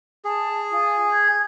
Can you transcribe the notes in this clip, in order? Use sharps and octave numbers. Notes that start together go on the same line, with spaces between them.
G#4 A5
F4 G#5 D#6
G6 G#6